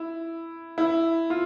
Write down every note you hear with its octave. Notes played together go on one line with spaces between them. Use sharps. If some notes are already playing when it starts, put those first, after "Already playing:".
Already playing: E4
E4
F4